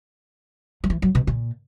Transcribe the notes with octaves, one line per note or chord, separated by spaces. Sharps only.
F#3
E3
F#3
B2
A#2